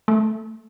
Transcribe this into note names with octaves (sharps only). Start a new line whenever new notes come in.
A3